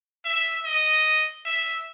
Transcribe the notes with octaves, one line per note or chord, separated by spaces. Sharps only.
E5
D#5
E5